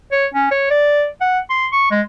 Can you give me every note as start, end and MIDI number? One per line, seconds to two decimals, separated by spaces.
0.12 0.27 73
0.34 0.47 61
0.51 0.68 73
0.70 1.07 74
1.21 1.39 78
1.50 1.67 84
1.72 1.89 85
1.91 2.02 56